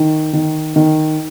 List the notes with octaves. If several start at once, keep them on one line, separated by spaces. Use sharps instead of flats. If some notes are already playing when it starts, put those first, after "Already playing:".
Already playing: D#3
D#3
D#3